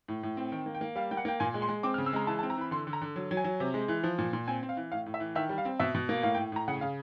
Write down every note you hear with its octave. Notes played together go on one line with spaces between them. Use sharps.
A2
A2
C4
D#3 G5
A#3
G5
A#3
G3 F5
A#3 G5
F#5
A#3 G5
A#2 G#5
G#3
C6
G#3
C4 D6
F6
C#3
E6
G#3 A#5
E3 A5
A5
C4
A#5
E3 B5
D3 C6
D3
A#5
D3
F#3
F#3
G#5
F#3
C3
G#3
E3
F3
A#2
A#2
C4 G#5
C4
F5
E3
A2 F5
A2
E5
E3
D#3 E5
G3
F5
C4
B2 E5
B2
A#3
A2 F5
G5
A2
A2 A#5
C#3 F#5
C#3 F5